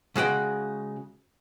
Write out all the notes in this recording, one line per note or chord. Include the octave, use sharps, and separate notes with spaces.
C#3 G#3 F#4 G5